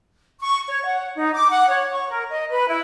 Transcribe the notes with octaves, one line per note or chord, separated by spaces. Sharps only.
C#6
C#5
F#5
D#4
D6
F#5
C#5
C#6
A#4
D#5
B4
E4